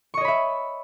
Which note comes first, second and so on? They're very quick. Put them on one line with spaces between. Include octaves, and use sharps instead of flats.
C#6 D#5 C#5 B5 E5